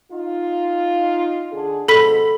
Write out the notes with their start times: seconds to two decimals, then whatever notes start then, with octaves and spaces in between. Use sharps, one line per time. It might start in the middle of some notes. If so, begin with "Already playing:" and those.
0.12 D#4 F4
1.52 D3 D4 G#4
1.88 B2 F3 G#3 A4 B5 B6